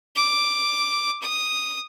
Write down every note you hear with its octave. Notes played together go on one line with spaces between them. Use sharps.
D6
D#6